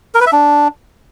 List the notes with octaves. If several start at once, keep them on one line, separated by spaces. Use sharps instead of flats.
A#4
B4
E5
D4